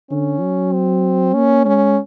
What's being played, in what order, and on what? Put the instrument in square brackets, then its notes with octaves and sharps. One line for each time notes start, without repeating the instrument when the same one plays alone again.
[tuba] D3 [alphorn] C#4
[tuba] F#3
[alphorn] C4
[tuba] A#3 [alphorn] C#4
[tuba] G#3 [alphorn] C#4